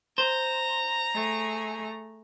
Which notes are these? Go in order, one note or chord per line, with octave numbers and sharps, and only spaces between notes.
C5 A#5
A3 G#4